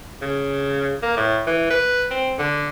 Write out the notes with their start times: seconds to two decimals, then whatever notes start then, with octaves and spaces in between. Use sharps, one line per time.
0.22 C#3
1.03 A#3
1.17 A2
1.47 E3
1.71 B4
2.11 C4
2.39 D3